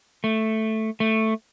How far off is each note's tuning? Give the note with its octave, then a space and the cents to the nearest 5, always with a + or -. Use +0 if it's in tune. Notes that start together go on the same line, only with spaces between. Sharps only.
A3 +0
A3 +5